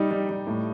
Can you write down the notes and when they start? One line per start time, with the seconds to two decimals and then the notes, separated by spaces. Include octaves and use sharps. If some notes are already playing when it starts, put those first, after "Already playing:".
Already playing: G3 D#4
0.11 G3
0.29 G3
0.47 A2